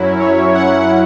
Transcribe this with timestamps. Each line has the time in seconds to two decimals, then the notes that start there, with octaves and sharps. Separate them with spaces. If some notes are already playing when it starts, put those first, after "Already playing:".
Already playing: F#2 F#3 C#4 E4
0.20 C#5
0.55 F#5